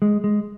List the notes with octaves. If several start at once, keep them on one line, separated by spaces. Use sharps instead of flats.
G#3
G#3